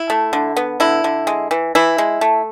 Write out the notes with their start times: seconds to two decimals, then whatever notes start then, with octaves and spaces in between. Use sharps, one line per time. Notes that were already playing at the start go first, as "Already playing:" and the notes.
Already playing: E4
0.10 A3
0.33 D3
0.57 B3
0.80 D3 E4
1.04 D3
1.27 G#3
1.51 E3
1.75 E3 E4
1.98 G#3
2.21 A3